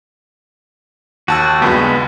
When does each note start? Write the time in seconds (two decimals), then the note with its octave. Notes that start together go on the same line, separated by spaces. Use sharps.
1.28 D#2 F#4 A5 E6
1.62 C#2 G2 G#3 B3 F#4